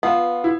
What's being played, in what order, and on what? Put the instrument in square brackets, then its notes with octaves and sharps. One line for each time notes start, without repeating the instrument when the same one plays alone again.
[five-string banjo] B3 [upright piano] F4
[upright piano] E4